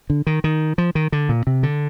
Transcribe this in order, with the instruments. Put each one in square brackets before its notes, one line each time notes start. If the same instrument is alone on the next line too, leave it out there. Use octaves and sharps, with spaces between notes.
[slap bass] D3
D#3
D#3
F3
D#3
D3
A#2
C3
D3